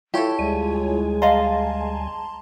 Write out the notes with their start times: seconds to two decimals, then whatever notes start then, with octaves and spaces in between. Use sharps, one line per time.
0.14 E4 F4 G4 A4 C#5
0.39 D2 G3 G#3 G#5
1.22 D#5 F5 A5 A#5 C6